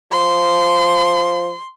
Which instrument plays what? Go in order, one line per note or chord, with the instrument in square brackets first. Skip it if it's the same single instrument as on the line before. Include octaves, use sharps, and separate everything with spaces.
[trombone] F3 [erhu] C6